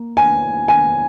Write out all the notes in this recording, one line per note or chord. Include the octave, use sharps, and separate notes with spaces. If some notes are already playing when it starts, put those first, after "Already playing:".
Already playing: A#3
G#5
G#5